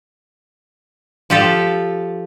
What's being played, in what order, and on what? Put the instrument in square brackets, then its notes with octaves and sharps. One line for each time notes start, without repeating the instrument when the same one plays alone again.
[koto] F3 G4 A4